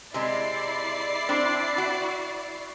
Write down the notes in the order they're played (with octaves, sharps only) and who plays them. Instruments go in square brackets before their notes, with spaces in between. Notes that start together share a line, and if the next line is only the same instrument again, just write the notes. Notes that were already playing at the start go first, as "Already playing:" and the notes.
[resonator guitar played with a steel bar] C3 G#3 [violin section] E4 D5 C7
[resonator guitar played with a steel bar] C4 D4
F#4